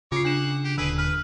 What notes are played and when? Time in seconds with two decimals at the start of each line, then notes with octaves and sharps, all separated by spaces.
0.12 C#3 F4 C#5 D6 C7
0.25 D4 F#5 E7
0.65 G4
0.78 D#1 D3 G#4 B4 E6
0.98 B4 F6